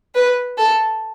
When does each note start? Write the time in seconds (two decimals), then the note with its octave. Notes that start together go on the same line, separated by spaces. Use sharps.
0.15 B4
0.58 A4